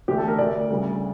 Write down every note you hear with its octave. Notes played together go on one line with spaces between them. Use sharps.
E2 D3 A3 G4
A4
A#4
D2 D3 A3 D5
D2 C#3 G3